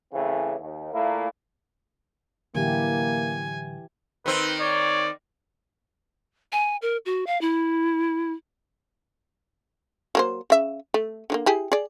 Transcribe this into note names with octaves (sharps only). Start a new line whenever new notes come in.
A2 C#3 E3 C4
D#2
A#2 A3 A#3 E4
A2 D3 E3 F#3 A#3 E4 G4 G#5
D#3 C4 B4
C#5 D5
G#5
A#4
F#4
F5
E4
F#3 A#3 C5
C#3 E5
A3
D3 F#3 A#3
E4 G4 G#4
G#4 D5